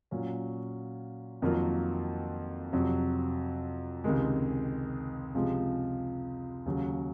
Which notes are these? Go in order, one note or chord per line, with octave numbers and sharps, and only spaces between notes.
A#2 F#3 C#4
F2 D#3 F#3 A#3 F4
F2 C3 F#3
C#2 C3 D#3 G#3
C#2 C3 F3 G#3
D#2 C#3 F#3